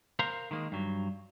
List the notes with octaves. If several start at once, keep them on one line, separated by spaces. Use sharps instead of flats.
A#4 C5 F5 A#5 C6
D#3 G#3 A#3
G2 F#3